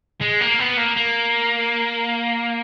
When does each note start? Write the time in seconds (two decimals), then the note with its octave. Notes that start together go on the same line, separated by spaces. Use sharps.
0.22 G#3
0.41 A#3
0.60 B3
0.77 A#3
0.97 A#3